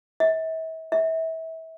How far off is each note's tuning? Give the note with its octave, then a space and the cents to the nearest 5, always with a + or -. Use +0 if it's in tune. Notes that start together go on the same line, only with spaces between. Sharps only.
E5 -40
E5 -30